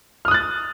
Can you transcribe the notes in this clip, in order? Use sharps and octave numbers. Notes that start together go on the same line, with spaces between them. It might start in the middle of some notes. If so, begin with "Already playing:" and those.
D#6 F6 F#6 A6